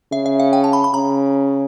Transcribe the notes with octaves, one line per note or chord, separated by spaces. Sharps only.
C#3 E5
E5
F5
G5
A5
B5
B5
C#3 A#5